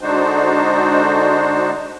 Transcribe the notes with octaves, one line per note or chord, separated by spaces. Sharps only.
D3 G#3 D4 D#4 F#4 C5